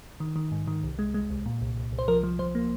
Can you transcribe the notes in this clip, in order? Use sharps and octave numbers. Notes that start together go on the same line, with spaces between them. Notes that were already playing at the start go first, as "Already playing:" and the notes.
D#3
D#3
G#2
D#3
C2
G#3
G#3
C2
A#2
C2
C2
C2
C5
F3 A#4
F3
F3 C5
A#3